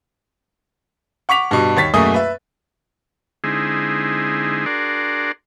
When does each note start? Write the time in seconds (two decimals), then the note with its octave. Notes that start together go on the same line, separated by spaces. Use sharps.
1.29 F#5 C#6 D6 B6 F7
1.51 G2 B2
1.77 D#2 C#5 A6 B6
1.94 F#2 B2 A3 A#3 G#4 D#6
2.14 B4 E5
3.44 D3 G#3 C4 D#4 E4 G#4
4.66 D4 F#4 G#4 A#4 D5 C6